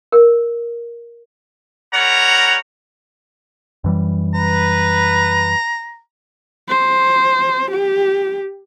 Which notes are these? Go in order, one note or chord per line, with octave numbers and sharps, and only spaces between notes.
A#4
G3 A#4 C#5 F#5 A#5
F#2 E3 G3
B4 A#5
C5
G4